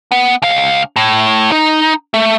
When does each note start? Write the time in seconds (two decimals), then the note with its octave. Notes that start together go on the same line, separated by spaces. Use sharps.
0.12 B3
0.42 C#2 F5
0.96 A2
1.52 D#4
2.14 A3